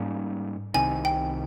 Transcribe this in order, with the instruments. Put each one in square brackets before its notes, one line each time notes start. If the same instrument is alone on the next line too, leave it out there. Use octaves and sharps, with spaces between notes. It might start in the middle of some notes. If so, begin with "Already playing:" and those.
Already playing: [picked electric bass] G#2 G3 A#3 C#4
[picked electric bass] C2 C3 D#3 [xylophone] G#5
[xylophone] G5